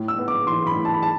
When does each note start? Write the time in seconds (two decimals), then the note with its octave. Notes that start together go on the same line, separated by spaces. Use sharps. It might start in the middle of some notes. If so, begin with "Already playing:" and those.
Already playing: A2
0.08 E6
0.18 B3
0.28 D6
0.47 E3 C6
0.67 B5
0.76 A2
0.85 A5
0.94 B5
1.03 A5